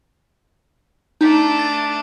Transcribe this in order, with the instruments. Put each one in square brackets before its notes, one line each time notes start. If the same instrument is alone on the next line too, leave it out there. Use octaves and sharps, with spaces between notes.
[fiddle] A3 D4 [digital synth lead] D#4
[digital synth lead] A6